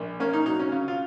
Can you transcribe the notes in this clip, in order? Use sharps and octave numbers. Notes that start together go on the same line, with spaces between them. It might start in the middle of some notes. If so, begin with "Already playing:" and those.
Already playing: A#1
A#3 C#4
D#4
F#3 D#4
C#4
C#3
F4